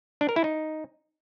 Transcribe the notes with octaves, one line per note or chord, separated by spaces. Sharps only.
D4
A#4
E4
D#4